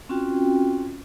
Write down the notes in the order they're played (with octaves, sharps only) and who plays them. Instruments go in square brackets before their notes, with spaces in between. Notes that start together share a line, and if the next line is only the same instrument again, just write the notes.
[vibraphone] C4 C#4 F4 F#4 G5